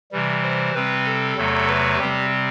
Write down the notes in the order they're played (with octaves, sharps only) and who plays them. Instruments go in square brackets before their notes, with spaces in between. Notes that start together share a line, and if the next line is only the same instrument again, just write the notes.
[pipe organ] C3 E3 G3
C5
C3 G3 C4 B4
A4
E2 C3 F#3 A3
B4
C3 G3 C4 G4